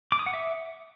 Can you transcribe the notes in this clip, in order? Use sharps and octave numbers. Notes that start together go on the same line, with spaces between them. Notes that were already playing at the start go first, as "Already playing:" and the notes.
D6
D#6
F#5
E5